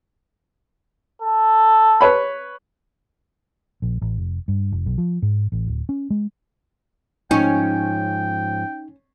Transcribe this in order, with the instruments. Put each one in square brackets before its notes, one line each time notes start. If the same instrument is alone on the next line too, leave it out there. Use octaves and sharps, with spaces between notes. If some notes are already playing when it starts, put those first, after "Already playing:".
[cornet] A4
[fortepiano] B4 C#5 B5
[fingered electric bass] A#1
A1
F1
G2
F1
B1
F3
G#2
A1
D1
C#4
G#3
[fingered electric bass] G#2 F3 [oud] C#4 [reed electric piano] D#4 [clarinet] G5